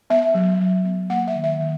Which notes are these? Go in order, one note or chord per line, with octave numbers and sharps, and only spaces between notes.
B3 E5
F#3
F#3
B3
A#3 F#5
E5
D#3
E5
D#3